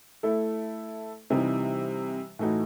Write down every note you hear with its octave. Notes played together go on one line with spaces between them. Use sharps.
A3 E4 A4
C3 E3 G3 D#4
A2 E3 A3 D#4 F#4